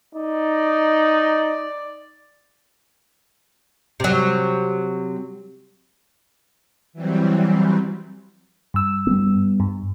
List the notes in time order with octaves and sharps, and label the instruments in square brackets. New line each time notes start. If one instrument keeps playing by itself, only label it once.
[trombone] D#4 [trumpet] D5
[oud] C3 F#3
[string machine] E3 F#3 G3 C4
[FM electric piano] G2 E6
[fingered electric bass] G3 A3 B3
[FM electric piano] G2